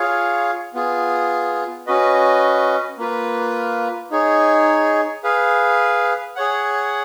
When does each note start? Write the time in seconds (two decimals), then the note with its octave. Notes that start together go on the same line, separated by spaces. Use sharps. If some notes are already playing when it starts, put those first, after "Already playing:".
Already playing: F4 G#4 C#5 F5
0.74 B3 F4 G#4
1.87 C#4 F#4 B4 D#5
2.98 A#3 F4 B4
4.11 D#4 G#4 C#5
5.23 G#4 B4 F5
6.36 G#4 C#5 F#5